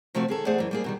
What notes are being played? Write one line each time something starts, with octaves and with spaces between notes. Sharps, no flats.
C3 F3 A3 C4 F#4
D#3 G#4 A4
E2 A3 G#4 C5 D5 F#5
F#2 E3
G3 A#3 G#4
B2 D#3 G3